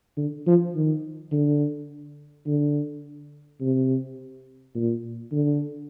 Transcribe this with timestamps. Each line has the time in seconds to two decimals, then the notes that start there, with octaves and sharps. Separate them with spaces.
0.17 D3
0.47 F3
0.75 D#3
1.32 D3
2.46 D3
3.61 C3
4.75 A#2
5.32 D3